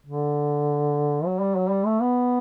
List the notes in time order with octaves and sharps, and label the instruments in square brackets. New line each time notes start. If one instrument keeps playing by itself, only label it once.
[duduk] D3
F#3
G3
F#3
G3
A3
B3